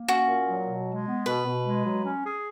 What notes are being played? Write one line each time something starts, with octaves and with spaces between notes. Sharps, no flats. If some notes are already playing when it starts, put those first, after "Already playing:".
Already playing: A#3
C#4 F#4
A#2
F#3
B2
G#3
B3
B2 B4
B2
G#3
F#3
C#4
G#4